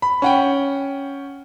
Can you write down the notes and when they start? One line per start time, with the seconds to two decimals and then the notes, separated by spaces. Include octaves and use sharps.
0.02 B5
0.22 C#4 F#5 G5